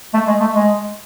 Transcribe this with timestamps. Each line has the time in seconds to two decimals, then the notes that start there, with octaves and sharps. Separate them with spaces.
0.13 A3
0.27 G#3
0.40 A3
0.54 G#3